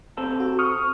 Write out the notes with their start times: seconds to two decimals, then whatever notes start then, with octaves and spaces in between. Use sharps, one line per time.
0.17 C3 C4 A4
0.40 F#4
0.59 C#6 D#6 F6